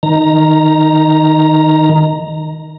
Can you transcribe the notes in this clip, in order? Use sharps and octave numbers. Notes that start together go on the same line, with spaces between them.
D#3 A#5